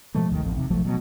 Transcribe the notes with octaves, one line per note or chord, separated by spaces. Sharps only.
B2 F3 G#3 A3
G1 D#2 D#3
A1 F2
C3 D#3
A#1 F3 F#3 A3
B2 F#3